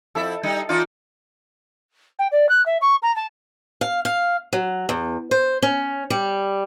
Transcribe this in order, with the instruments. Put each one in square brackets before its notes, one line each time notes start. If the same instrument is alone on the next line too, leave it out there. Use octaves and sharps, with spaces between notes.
[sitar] F2 E4 E5 [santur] A4
[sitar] G3 D#4
[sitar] E3 D#4 D5 [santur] F4
[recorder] G5
D5
F#6
E5
C#6
A#5
A5
[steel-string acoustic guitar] F5
F5
F#3
E2
C5
C#4
G3